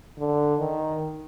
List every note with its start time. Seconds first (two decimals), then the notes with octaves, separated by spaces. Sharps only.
0.18 D3
0.60 D#3